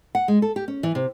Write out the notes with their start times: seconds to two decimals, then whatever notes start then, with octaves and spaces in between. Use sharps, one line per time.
0.15 F#5
0.28 G#3
0.42 A4
0.56 G4
0.68 C#4
0.83 E3
0.95 C3